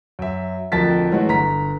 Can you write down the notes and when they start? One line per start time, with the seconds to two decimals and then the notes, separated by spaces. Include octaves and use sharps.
0.19 F#2 E5
0.72 D1 F2 A#4 A5 A6 B6
1.12 E3 F#3 G#3 A3 F#4
1.29 G1 A#5 B6